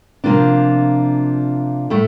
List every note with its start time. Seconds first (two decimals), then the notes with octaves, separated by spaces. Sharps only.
0.24 C3 F3 A#3 D4 F4
1.90 A2 A3